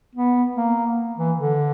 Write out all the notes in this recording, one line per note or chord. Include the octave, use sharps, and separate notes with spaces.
B3
A#3
E3
D3